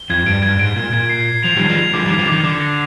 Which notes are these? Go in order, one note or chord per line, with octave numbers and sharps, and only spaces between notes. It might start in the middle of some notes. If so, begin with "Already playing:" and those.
Already playing: G7
F2 G#6
G2 D7
G2 G#6
G#2 D7
A#2 G#6
A#2 G#6
C7
C7
F3 F7
D#3 G3 G#6
F3 G#3
F7
D3 F3 D6
D#3 G3
D6
D3 F3
D#3 D6
D3 D6
A#6